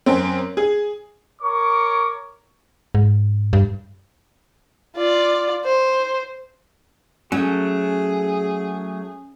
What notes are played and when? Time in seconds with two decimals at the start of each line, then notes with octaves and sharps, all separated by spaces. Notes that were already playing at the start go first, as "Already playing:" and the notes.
0.06 F#2 C4
0.57 G#4
1.42 A#4 C#5 C#6 D6
2.95 G#2
3.53 G2
4.97 F4 D5
5.64 C5
7.32 F#3 A3 C#4 G#4